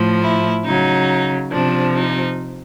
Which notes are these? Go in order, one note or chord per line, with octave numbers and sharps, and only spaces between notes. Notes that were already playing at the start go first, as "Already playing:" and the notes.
Already playing: A2 F3
E4
C#3 F#3 D#4
C3 F3 D4
D#4